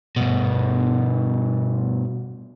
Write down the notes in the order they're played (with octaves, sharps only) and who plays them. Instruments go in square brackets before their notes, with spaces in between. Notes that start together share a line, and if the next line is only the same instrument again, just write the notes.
[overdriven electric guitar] G2 B2